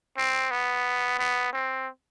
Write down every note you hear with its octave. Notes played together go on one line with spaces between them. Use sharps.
C4
B3
B3
C4